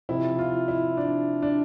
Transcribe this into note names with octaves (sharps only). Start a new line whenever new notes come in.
C3 F3 E4
F4
E4
D4
D4